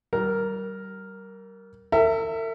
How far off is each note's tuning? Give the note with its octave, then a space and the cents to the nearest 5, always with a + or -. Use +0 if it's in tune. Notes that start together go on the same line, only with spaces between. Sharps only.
G3 -35 A#4 +0
A#4 -45 E5 +0